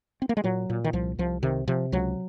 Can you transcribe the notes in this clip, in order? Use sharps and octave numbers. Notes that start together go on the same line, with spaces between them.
C4
A#3
G#3
A#2 F#3
A#2
D#3
C2 F3
C2 F3
C3 D#3
C3 F3
C#2 F#3